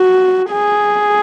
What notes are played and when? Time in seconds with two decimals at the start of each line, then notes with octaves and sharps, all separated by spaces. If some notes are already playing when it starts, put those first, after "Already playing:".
Already playing: F#4
0.51 G#4